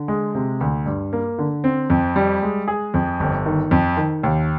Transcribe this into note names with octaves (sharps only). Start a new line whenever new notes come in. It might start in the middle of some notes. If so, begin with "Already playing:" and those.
Already playing: D3
G#3
C3
D2
G2
A#3
D3
C4
F2
G3
G#3
G#4
F2
G1
D#3
F2
D#3
D#2